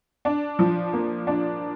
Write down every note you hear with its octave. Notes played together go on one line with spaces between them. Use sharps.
D4
F3
A#3
D4